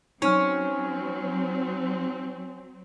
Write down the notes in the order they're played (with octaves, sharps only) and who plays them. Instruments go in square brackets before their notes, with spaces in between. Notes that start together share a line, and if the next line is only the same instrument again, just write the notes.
[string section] F#3 C4 [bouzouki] C#4 [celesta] D#4 F6